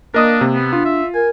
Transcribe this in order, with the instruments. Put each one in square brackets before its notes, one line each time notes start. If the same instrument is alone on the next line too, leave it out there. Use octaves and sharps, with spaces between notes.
[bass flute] A#3 [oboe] D4 [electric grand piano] A#4 D#5 D#6
[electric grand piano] C3
[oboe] B3
[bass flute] D4 [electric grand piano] F4
[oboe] E5
[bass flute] A#4 [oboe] G#5